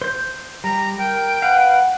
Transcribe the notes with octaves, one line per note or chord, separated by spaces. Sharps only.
C5 G6
G3 A#5
A#4 G5
B4 F5 F#5